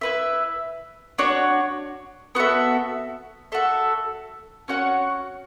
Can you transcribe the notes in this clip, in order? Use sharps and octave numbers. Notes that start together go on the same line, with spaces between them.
E4 B4 E5
D4 F#4 C#5 F#5
B3 F#4 A4 E5
F#4 A4 E5
C#4 F#4 C#5 F#5